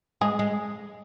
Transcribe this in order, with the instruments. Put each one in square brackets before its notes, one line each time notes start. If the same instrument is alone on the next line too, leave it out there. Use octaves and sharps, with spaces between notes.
[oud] G#3 [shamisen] G#4
[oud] G#3